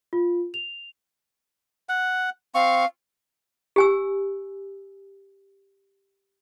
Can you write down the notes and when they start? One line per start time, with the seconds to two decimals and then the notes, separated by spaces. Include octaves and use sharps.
0.13 F4
0.54 F7
1.89 F#5
2.55 C4 F5 C#6
3.76 G4 G#5 E6